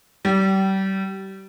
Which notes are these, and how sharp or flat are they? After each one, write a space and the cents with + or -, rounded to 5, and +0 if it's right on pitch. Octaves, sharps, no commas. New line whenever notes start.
G3 -30